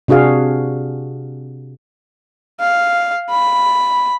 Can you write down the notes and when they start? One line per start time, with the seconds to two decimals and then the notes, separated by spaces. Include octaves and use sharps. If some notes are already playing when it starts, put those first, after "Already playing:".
0.08 C3 D4 F#4 G#4 F5
2.61 F5
3.31 B5